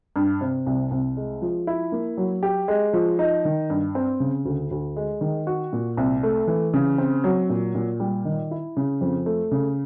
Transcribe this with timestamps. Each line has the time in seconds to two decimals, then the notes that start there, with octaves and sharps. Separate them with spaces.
0.16 G2
0.41 C3
0.66 C2
0.91 C2
1.17 G#3
1.42 F3
1.67 E4
1.92 A#3
2.17 F#3
2.43 G4
2.68 G#3
2.93 F3
3.19 D#4
3.45 D#3
3.70 G2
3.95 C4
4.20 C#3
4.45 D2
4.71 D2
4.96 G#3
5.21 D#3
5.47 F#4
5.73 A#2
5.97 C2
6.23 A3
6.48 E3
6.74 C#3
6.98 C4
7.24 F#3
7.50 A#2
7.75 A#2
8.00 G3
8.25 D#3
8.51 E4
8.77 C#3
9.01 F2
9.26 A3
9.51 C#3